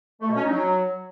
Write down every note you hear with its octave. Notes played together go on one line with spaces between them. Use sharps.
A3
B2
C#4
D#4
F#3